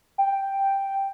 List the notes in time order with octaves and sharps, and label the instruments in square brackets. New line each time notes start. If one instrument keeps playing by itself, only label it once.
[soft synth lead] G5